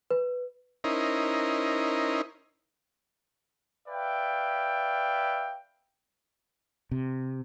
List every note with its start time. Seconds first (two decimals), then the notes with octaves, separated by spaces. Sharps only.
0.11 B4
0.84 C#4 D#4 E4 A#4 C5 D#5
3.88 B4 D5 E5 F5 G5
6.91 C3